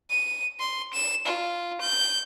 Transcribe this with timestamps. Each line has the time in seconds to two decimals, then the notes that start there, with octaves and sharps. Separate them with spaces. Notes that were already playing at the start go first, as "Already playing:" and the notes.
0.10 D#7
0.60 C6
0.93 E7
1.26 F4
1.81 G6